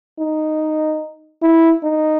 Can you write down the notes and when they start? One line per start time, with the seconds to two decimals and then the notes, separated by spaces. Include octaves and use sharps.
0.20 D#4
1.43 E4
1.84 D#4